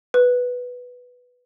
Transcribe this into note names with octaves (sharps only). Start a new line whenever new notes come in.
B4